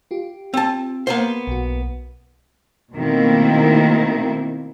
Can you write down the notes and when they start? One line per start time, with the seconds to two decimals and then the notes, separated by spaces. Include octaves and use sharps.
0.11 F4 G4
0.54 C4 A5
1.07 A#3 B3 C5
1.47 B1 F#4
2.94 B2 D#3 A3 A#3 C4 E4